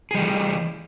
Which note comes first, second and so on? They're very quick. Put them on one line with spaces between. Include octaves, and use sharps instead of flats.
G#4 G3 E3